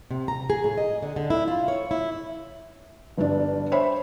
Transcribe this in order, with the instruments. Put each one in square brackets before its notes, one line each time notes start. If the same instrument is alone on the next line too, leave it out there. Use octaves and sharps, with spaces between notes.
[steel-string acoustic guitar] C3
A#5
G#4
A2
D#5
D3
D3
E4
F4
C#5
E4
[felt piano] G1 G2 D4
C5 C#5 E5 B5